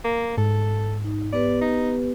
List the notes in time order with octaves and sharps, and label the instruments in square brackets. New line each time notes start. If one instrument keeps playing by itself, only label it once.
[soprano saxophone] A#3
[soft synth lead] G#2 [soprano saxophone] A4
[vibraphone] D#4
[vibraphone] B3 G4 B4 [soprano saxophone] D5
[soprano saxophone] D#4